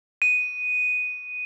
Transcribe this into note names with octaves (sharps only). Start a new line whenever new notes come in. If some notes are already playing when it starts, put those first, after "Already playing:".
D#7